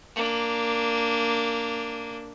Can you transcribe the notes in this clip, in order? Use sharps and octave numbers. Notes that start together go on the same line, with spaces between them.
A#3 D4